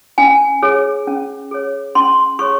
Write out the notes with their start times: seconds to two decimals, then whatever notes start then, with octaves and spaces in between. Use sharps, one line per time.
0.18 C#4 G#5
0.63 G#4 C#5
1.07 C#4
1.51 G#4 C#5
1.95 C#4 C6
2.39 G#4 C#5 C#6